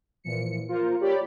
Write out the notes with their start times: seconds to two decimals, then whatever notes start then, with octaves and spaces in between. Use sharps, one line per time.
0.24 A#2 E3 F3 C#7
0.68 A#3 F4 A#4 C5
1.01 G4 C#5 D5 B5